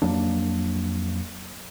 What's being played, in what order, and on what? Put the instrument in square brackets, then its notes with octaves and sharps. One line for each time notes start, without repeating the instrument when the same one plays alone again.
[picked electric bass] F2 F#3 A#3 D4